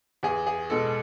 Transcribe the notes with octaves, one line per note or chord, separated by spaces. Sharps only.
E2 G#4
G#4
B2 G#3 A4